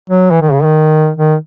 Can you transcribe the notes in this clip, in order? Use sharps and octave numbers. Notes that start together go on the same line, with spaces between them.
F#3
E3
D#3
C#3
D#3
D#3